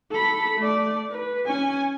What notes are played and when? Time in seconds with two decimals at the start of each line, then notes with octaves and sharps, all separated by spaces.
0.11 A4 B5
0.58 A3 D5
1.10 B4
1.46 C#4 G#5